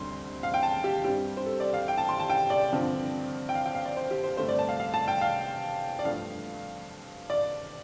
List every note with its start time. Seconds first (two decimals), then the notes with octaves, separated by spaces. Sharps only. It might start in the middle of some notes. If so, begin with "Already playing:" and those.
Already playing: D2 D3 G3 C4 C6
0.43 F5
0.54 G5
0.63 A5
0.84 G4
1.04 G2 G3 C4 G4
1.37 C5
1.46 A4
1.60 D5
1.74 F5
1.88 G5
1.98 A5
2.09 C6
2.19 A5
2.29 G5
2.50 D5
2.72 G2 D3 F3 C4
3.49 G5
3.55 F5
3.66 G5
3.75 F5
3.85 D5
3.97 C5
4.11 G4
4.23 C5
4.37 G2 D3 A3 C4 C5
4.48 D5
4.59 A5
4.69 F5
4.80 F5
4.94 A5
5.08 G5
5.21 F5
5.99 D5
6.05 G2 F3 A3 F5
7.30 D5